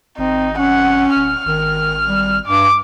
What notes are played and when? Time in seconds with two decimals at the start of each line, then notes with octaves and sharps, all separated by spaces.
0.18 G#1 C4 D#4
0.58 C#4 F#5
1.16 D1 F6
1.46 G#1 D#3
2.06 G3
2.47 G2 D6